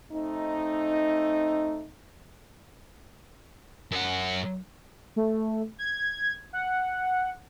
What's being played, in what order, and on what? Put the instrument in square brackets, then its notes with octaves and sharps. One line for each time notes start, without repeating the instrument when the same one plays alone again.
[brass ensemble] A3 C4 D#4
[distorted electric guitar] F#2 F#5
[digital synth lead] A3
G#6
F#5